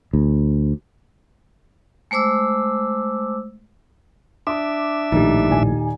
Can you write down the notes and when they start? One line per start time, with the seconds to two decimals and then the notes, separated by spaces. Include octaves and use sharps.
0.13 D2
2.11 G#3 A3 C5 D6 E6
4.47 D4 E5 D6 D#6
5.12 A#1 A2 D#3 D#4 G4
5.48 D#1 A#2 G#5